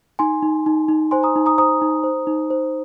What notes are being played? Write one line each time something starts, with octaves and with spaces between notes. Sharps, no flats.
D#4 G#5 C6
D#4
D#4
D#4
C5 G#5 C6
A#5 D#6
D#4
A#5 D#6
C5 A#5 D#6
D#4
C5
D#4
C5